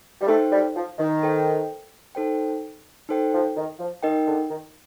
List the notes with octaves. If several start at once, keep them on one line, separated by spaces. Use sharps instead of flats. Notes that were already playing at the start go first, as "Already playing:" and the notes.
G3
A3 D#4 A4 C5 G5
G3
F3
D#3
D#4 A4 C5 G5
D#4 A4 C5 G5
D#4 A4 C5 G5
F3
D#3
F3
D#3 D#4 A#4 D#5 G5
D3
D#3